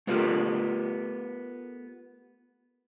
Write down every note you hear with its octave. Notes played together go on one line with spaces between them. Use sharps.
A3 B3 F4 G4 A#4